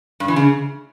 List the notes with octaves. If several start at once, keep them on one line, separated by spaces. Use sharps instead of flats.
G2
E3
C#3